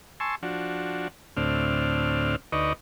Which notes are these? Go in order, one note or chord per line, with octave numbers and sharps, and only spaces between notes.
G#5 A5 C6 C#6 E6
F3 D4 F#4
D2 A2 C4 D4 F6
D2 D#4 B4 D5 D#5 C#6